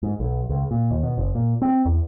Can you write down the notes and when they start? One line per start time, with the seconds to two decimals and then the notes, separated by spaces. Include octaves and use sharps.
0.03 G#2
0.20 B1
0.49 C#2
0.71 A#2
0.91 D#2
1.03 B2
1.18 F#1
1.35 A#2
1.62 C4
1.85 E2